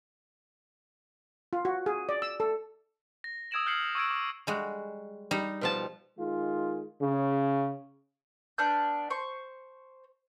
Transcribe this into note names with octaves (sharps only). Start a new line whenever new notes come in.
F4
F#4
G#4
D5
E6
A4
A#6
D#6 E6 G#6 D7 E7 F#7
F6 G6 G#6 C7 C#7 F#7
C#6 E6 G#6 D7
D6
G3 G#3 F#4
G3 D#4
B2 F3 A5
D#3 G#3 F4
C#3
B3 D4 F6 G6
C5 C#6